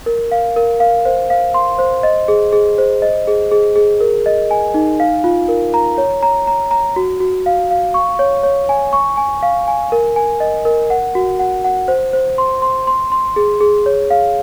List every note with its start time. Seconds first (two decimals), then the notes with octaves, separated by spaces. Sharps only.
0.06 A#4
0.31 F5
0.56 A#4
0.80 F5
1.05 C5
1.30 F5
1.54 C6
1.79 C5
2.03 D#5
2.28 G#4
2.53 G#4
2.78 C5
3.02 D#5
3.27 G#4
3.52 G#4
3.76 G#4
4.00 A#4
4.26 D#5
4.51 G#5
4.74 D#4
5.00 F5
5.24 F4
5.48 A#4
5.74 A#5
5.98 C#5
6.23 A#5
6.47 A#5
6.71 A#5
6.96 F#4
7.20 F#4
7.46 F5
7.71 F5
7.94 C#6
8.19 C#5
8.44 C#5
8.69 G#5
8.93 C#6
9.17 G#5
9.43 F5
9.68 G#5
9.92 A#4
10.16 G#5
10.40 D#5
10.65 A#4
10.90 F#5
11.15 F#4
11.39 F#5
11.65 F#5
11.88 C5
12.13 C5
12.38 C6
12.62 C6
12.87 C6
13.12 C6
13.36 G#4
13.61 G#4
13.86 C#5
14.10 F5